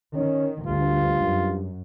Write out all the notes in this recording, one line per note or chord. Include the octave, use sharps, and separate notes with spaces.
D#3 C#4
D2 G2 F4
F#2